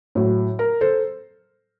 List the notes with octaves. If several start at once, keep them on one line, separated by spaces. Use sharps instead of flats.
A2 F#3
A#4
A4 C5